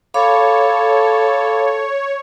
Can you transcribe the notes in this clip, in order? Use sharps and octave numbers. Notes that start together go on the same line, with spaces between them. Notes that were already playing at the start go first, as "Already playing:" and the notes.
A4 C#5 F5 B5 D6